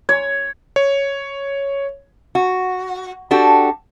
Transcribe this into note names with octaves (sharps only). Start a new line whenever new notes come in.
C#5
C#5
F#4
D4 F#4 G4 A4